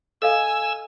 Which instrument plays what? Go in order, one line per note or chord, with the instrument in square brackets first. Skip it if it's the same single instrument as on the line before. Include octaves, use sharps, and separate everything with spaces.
[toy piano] A4 D#5 F5 [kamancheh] G#5 [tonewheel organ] E6